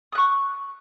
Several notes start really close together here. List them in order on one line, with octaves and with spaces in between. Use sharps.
D#6 F#6 C#6